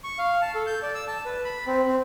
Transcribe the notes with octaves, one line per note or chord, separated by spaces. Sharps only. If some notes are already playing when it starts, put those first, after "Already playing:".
C#6
F5
A5
A4
G6
D5
E6
A5
B4
B5
C4
C4